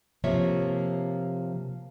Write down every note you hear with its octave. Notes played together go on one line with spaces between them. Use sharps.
C3 F3 A#3 C#5 E5